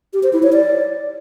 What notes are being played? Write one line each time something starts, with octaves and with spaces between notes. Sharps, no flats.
G4
C5
E4
C#5
D5